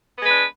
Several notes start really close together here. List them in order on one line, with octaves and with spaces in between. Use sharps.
B3 G#3 B4 D4